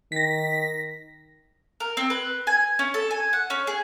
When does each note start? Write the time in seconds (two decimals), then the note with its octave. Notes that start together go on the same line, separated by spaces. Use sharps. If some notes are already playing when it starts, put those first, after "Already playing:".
0.12 D#3 A#6 B6
1.80 A#4
1.97 C4
2.10 B4
2.47 G#5
2.79 C#4
2.94 A4
3.11 G#5
3.33 F#5
3.50 C#4
3.67 G#4